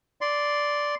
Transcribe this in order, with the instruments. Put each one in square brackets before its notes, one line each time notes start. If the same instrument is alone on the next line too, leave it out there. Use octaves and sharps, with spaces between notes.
[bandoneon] D5 C6